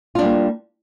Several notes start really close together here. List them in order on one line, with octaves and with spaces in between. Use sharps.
F4 D4 G3 A#3